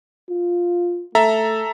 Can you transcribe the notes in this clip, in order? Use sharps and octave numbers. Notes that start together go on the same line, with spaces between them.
F4
A3 A4 E5 A#5